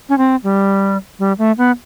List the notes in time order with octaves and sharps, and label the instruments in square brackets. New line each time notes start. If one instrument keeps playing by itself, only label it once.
[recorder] C#4
C4
G3
G3
A3
B3